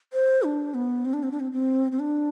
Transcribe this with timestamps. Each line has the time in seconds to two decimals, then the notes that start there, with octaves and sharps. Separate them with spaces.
0.13 C5
0.43 D4
0.74 B3
1.05 C4
1.13 D4
1.23 C4
1.31 D4
1.40 C4
1.52 C4
1.92 C4
1.99 D4